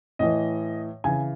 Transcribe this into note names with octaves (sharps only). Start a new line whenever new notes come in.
A2 E3 D#5
C#3 E3 G#5